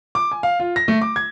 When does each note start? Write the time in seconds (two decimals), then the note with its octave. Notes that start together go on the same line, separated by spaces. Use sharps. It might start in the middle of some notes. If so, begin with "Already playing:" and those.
0.15 D6
0.31 G#5
0.43 F5
0.60 F4
0.76 A#6
0.88 A3
1.02 D6
1.16 G#6